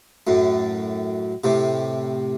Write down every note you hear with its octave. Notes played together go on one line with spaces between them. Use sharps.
F#2 A2
A2 C3